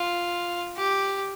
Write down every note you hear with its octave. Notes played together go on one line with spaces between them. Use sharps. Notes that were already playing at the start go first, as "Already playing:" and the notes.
Already playing: F4
G4